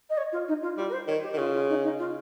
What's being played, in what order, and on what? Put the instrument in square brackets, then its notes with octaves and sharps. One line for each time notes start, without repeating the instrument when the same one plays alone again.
[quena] D#5
C#5
F4
D#4
F4
[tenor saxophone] G3 [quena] F4
[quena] A#4
C5
[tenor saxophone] D#3 [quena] C#5
[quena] G4
[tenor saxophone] D#3
[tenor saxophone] C#3 [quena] F4
[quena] F4
D#4
D#4
F4